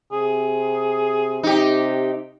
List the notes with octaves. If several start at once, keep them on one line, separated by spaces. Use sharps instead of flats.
C3 G#4
C3 D#4 G4